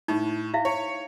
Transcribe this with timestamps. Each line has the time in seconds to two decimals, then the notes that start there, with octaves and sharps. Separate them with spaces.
0.08 A2 D#4
0.54 E4 E5 F5
0.65 C#5